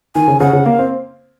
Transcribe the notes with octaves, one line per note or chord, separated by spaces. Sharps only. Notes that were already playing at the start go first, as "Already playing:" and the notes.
D#3 G#5
C#3
C#3 F#5
C#3
A#3 F5
C4